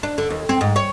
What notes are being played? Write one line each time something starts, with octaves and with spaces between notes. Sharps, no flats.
D4
D3
D#2
C4
G#2
C#5